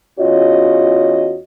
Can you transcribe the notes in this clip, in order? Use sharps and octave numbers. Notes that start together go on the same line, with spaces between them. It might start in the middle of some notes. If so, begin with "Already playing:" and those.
E2 C#4 F4 F#4 C#5 D#5